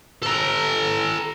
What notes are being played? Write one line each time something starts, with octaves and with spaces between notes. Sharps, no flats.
A4 A#5